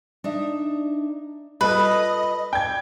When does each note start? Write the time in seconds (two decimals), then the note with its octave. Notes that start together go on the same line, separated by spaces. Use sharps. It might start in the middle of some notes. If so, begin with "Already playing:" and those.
0.24 D4 D#4 E5
1.61 G3 F4 A4 B4 D#5 B5
2.53 D5 G5 G#6